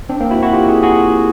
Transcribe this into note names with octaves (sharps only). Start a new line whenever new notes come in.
C4 D4
A#3 C4
E4 F#4
E4 F#4
F4 G4
F#4 G#4
F#4 G#4